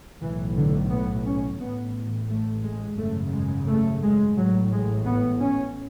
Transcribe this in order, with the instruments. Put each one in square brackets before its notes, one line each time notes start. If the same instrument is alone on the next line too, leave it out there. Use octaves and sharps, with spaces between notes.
[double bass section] B1 A2 E3
D3
B3
C#4
A1 A2 B3
A3
G#3
G#1 F#2 C#3 A3
G#3
A3
G#3
A1 A2 F#3
G#3
B3
C#4